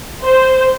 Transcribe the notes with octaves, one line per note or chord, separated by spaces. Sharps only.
C5